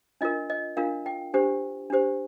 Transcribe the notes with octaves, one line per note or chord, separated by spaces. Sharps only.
D4 F4 A#4 D#5
D#5
D4 F4 A#4 F5
G5
D4 G4 C5
D4 G4 C5